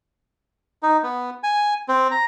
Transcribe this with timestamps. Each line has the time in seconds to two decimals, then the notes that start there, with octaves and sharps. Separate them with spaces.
0.83 D#4
1.03 B3
1.43 G#5
1.88 C4
2.11 A#5